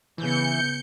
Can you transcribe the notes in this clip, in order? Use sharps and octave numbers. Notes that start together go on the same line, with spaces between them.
C#3 E3 B3 G6 C#7